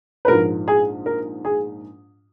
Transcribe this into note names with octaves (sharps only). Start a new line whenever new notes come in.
B4
A#1 G#2 F3 A#4
G#4
A#4
G#4